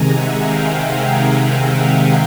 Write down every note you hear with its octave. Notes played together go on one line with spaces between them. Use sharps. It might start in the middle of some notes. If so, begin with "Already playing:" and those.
Already playing: C3 D#3 G#3 G#5 A#5
E5 F#5
F5 G5